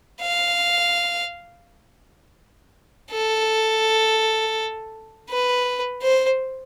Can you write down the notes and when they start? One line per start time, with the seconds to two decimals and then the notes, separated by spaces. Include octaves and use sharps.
0.21 F5
3.12 A4
5.30 B4
6.02 C5